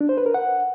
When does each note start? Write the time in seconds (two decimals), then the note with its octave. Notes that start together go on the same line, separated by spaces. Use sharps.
0.01 D4
0.09 C5
0.17 B4
0.26 A#4
0.34 F#5